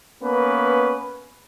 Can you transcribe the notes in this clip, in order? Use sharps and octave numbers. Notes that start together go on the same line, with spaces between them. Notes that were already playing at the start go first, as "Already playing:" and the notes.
A#3 B3 C#4 B4